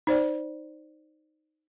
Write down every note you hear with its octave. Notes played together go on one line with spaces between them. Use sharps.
D#4 C5 D5